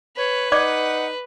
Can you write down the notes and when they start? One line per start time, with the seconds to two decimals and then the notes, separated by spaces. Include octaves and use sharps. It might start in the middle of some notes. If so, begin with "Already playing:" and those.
0.17 B4 C#5
0.52 D#4 D5 F#5 D6